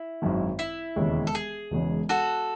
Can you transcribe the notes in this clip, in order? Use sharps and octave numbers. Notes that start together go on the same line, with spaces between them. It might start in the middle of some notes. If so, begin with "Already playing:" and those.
Already playing: E4
G#1 F#2 D#3
E4
E1 D#2 C#3 G#3
A4
G#4
E1 E2 C#3 G#3
F#4 A4